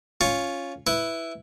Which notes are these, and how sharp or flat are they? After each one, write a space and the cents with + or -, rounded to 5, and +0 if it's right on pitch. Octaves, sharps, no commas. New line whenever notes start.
C#4 +0 F4 +0
E4 +0 B4 +0